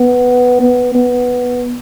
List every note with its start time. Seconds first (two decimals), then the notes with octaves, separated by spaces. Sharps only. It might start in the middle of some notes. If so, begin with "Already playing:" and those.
Already playing: B3
0.61 B3
0.95 B3